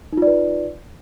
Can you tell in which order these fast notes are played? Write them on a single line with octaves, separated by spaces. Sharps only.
D#4 F4 D5 B4